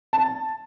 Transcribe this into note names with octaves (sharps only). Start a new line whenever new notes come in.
A5